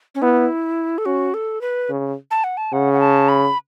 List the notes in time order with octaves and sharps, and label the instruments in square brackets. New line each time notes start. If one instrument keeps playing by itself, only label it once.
[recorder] C#4
[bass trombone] B3 [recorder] E4
[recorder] A4
[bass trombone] C#4 [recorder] F#4
[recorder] A4
B4
[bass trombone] C#3
[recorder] A5
F#5
A5
[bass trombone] C#3 [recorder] F#5
[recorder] F#5
A5
B5